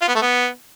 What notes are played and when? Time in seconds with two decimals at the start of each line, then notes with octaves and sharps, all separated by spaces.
0.02 F4
0.08 B3
0.15 A3
0.22 B3